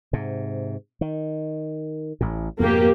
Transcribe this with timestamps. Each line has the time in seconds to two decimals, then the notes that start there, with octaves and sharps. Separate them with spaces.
0.13 G#2 C3
1.01 D#3
2.21 A1 A2
2.60 F2 G#2 B2 A#3 G4